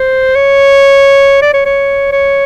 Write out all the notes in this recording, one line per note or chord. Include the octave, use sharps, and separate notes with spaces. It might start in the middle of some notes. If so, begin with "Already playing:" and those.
Already playing: C5
C#5
D5
C#5
C#5
C#5